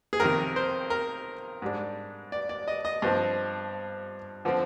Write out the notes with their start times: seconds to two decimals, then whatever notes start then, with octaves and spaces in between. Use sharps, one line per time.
0.13 G#4
0.20 F2 C3 D#3 A#4
0.56 C5
0.90 A#4
1.62 G#2 G3 D4
2.32 D5
2.49 D5
2.68 D#5
2.85 D#5
3.02 G2 F3 C4
4.45 D3 F3 C4